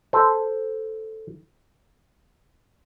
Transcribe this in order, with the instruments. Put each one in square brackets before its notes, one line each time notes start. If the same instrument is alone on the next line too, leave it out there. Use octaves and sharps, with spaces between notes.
[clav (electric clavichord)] A4 C5